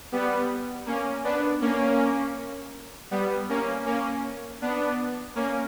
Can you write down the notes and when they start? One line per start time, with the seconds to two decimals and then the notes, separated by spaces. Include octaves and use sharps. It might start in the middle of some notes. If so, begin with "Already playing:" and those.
0.12 G3 B3
0.86 A#3 C#4
1.24 B3 D4
1.61 A#3 C#4
3.11 G3 B3
3.49 A#3 C#4
3.86 A#3 C#4
4.62 B3 D4
5.36 A#3 C#4